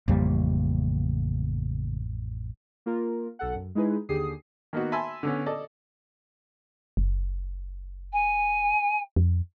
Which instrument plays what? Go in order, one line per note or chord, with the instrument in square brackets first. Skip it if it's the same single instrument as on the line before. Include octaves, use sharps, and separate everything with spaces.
[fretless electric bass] A1 F2 G3 [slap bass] C#3 A#3
[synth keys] A#3 F4 A#4
B1 A4 F#5
F#2
G#3 D#4 E4 G#4 B4
D#2 D3 G4 G#4 D#6 C7
[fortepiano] D#3 A#3 B3 D#4 F#4
E5 G#5 A5 B5 C6 E6
D3 B3 C#4
A4 D5 D#5 A5
[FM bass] F#1
[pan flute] G#5
[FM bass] F2